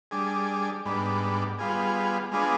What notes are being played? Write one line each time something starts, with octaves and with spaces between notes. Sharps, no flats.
G3 D4 G#4
G#2 G3 B3 D4
G3 B3 F4 G#4
G#3 B3 D4 F4 G#4